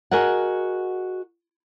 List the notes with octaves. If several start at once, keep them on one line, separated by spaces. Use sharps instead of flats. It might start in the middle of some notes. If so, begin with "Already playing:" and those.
F#4 G#4 A#4 D#5 F#5